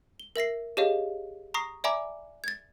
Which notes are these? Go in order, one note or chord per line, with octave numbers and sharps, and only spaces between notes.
G7
A#4 E5 A#6 C7
G4 G#4 C#5 D#5 F5
A#5 C#6 D#6 A#6 C7
D5 E5 G#5 A#5 B5 D6
G#6 A6